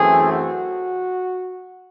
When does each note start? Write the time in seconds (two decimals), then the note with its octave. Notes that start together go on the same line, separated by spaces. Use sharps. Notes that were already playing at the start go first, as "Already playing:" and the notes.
Already playing: F#2 E3 A3 C4 G#4
0.32 F#4